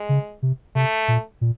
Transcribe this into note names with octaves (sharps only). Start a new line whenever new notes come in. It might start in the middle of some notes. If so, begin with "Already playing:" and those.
Already playing: G#3
C#3
C3
C3 A3
A#2
A#2